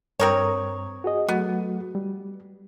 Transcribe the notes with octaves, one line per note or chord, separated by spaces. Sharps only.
G2 C4 A#4 C#5 D#6
F#4 G#4 D#5
F#3 A3 B3 F#4
G3